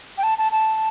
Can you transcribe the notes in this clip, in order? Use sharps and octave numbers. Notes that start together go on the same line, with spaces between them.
G5
A5
A5
A5